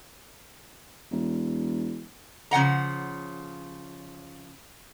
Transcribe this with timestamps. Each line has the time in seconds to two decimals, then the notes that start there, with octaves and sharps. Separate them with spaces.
1.11 E1
2.51 C#3 F3 F#5 A#5